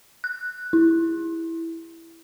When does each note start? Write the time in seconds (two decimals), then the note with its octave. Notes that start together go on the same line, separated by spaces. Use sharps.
0.24 F#6
0.73 E4